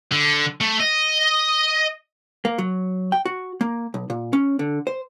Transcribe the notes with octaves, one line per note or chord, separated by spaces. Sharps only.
D3
A3
D#5
A#3
F#3
G5
F#4
A#3
B1
A#2
C#4
D3
C5